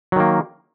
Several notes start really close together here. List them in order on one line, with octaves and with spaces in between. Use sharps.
F#3 D#3 A#3